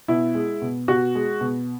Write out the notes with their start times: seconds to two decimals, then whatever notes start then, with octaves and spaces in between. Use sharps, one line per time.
0.08 B2 E4
0.35 G#3
0.62 B2
0.88 B2 F#4
1.15 G#3
1.41 B2